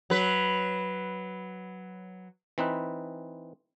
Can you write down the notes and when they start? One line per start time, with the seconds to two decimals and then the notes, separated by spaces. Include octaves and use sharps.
0.10 F#3 B4
2.58 E3 C4 D#4 B4